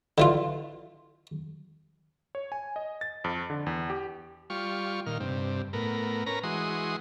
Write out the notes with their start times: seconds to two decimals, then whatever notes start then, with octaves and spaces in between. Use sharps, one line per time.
0.18 D3 E3 F4
2.35 C#5
2.52 G#5
2.76 D#5
3.01 A6
3.24 F2
3.50 D3
3.66 E2
3.90 G4
4.50 G3 F4 C#6
5.06 A#2 D#3 F6
5.20 G2 C3
5.73 A2 B3 A#4
6.26 C#4 A#4 B4 A#5
6.43 E3 G#3 F#4 C6 D#6